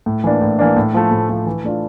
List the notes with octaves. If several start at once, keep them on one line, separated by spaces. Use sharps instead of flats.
A2
E3 A#3 D4
A2
E3 A#3 D4
A2
F3 A3
A2
F3 A3
E3
A3 D4 F4